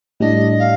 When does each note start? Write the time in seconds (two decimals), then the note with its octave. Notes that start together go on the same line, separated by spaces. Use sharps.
0.20 A2 G3 D4 D#5
0.59 F5